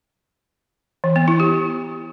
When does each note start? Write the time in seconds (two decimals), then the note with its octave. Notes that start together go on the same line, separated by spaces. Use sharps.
1.04 E3
1.16 B3
1.28 E4
1.40 G4